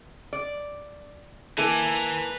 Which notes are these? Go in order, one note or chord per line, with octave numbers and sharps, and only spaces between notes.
D5
A#3 E4 A4 B4 G#5